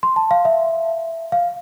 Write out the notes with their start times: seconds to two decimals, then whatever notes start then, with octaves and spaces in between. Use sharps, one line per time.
0.03 C6
0.16 A5
0.31 F5
0.45 E5
1.32 F5